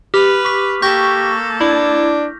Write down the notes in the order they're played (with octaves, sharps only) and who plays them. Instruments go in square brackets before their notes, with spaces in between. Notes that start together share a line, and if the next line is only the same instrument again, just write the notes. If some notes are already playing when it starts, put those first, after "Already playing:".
[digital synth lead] G4 [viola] B4 [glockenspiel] F6 F7
[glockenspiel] C#6 D6 B6
[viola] A#3 A4 [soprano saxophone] G4 [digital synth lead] C#6 [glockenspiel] G6 A#6
[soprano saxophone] D4 [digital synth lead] E4